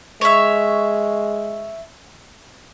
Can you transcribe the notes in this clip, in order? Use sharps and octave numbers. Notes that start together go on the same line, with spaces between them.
G#3 C#5 E5